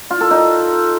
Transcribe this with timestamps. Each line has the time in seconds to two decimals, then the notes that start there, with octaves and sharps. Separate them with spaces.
0.11 F4
0.21 A4
0.31 D#4